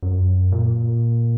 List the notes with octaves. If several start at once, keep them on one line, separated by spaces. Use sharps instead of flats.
F#2
A#2